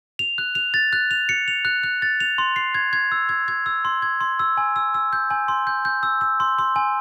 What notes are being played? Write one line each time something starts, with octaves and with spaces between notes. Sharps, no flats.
F7
F#6
F7
A6
F#6
F7
C#7
F7
F#6
F#6
A6
F7
C6
C7
G#6
G#6
E6
G#6
G#6
E6
C6
G#6
C6
E6
G#5
E6
E6
G6
G#5
C6
G6
G6
E6
E6
C6
C6
G#5